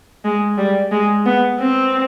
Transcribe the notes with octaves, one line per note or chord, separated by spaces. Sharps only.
G#3
G3
G#3
B3
C4